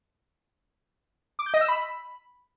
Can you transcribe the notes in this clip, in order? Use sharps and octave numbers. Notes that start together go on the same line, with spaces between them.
D6
G6
D#5
E6
B5